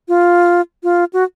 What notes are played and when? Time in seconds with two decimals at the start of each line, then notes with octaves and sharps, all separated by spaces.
0.08 F4
0.83 F4
1.13 F#4